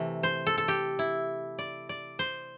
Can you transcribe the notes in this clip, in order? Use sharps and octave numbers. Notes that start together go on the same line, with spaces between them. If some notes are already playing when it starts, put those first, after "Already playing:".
Already playing: C3 E3 A3
C5
A4
A4
G4
E4
D5
D5
C5